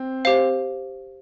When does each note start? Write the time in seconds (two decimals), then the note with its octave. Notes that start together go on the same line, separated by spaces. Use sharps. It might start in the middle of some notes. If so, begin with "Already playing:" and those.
Already playing: C4
0.25 G4 C5 F5